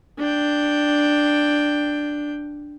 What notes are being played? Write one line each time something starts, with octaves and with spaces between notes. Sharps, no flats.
D4 G5